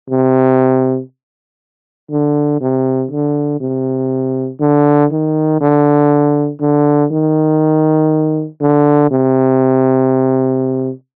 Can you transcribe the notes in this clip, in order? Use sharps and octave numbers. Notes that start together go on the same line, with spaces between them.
C3
D3
C3
D3
C3
D3
D#3
D3
D3
D#3
D3
C3